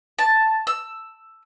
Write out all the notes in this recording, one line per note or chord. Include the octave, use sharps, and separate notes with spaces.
A5
E6